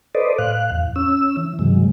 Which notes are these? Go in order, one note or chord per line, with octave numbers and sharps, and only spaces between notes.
A4 B4 C5 D5 D#5
A2 F5 F#6
E2
C#4 E6
E3
G2 C3 D#3 F#3 G#3